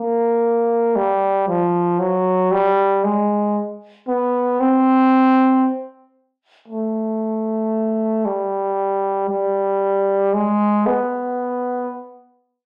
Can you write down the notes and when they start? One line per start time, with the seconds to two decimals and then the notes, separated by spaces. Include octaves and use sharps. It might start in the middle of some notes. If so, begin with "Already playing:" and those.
Already playing: A#3
0.96 G3
1.48 F3
1.99 F#3
2.51 G3
3.04 G#3
4.08 B3
4.60 C4
6.68 A3
8.25 G3
9.29 G3
10.34 G#3
10.86 B3